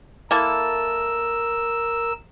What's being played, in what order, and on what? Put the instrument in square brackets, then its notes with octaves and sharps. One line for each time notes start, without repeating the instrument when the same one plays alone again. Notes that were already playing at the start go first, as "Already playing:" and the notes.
[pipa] A#3 E4 A4 [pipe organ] A#4 E6